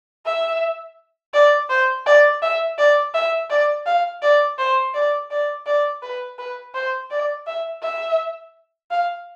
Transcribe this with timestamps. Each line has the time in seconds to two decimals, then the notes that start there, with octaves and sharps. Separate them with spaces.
0.26 E5
1.34 D5
1.70 C5
2.06 D5
2.42 E5
2.78 D5
3.14 E5
3.50 D5
3.86 F5
4.22 D5
4.59 C5
4.94 D5
5.31 D5
5.67 D5
6.02 B4
6.39 B4
6.75 C5
7.11 D5
7.47 E5
7.83 E5
8.91 F5